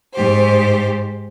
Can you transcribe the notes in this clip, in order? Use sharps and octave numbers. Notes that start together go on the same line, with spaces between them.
G#2 G4 C5